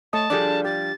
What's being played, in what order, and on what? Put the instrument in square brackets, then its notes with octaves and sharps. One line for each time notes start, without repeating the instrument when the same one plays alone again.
[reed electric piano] A3 D#5 D#6 [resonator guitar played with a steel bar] C#5 [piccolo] A5
[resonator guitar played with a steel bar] F3 G3 D4 [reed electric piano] G#4 A4 D5
[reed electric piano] G4 [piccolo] A6